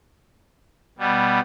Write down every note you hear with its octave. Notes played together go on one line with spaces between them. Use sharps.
B2 G3 B3